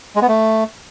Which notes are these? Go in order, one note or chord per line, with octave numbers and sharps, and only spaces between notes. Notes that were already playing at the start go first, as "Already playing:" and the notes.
G#3
B3
A3